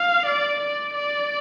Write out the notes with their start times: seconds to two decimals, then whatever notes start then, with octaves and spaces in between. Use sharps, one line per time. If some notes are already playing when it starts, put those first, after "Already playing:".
Already playing: F5
0.26 D5
0.60 D5
0.94 D5